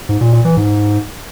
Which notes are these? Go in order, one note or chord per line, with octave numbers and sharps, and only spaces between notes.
G#2
A#2
A#2
E3
G#2